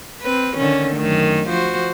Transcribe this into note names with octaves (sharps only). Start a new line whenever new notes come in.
C4 B4
D3 D#3 C#4
F#2 D#3 A3
F3 F#4 C5